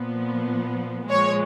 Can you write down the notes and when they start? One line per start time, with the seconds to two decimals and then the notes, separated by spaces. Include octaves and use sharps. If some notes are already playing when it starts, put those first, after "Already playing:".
Already playing: A#2 F3 B3
1.10 A#2 F3 G#3 C#5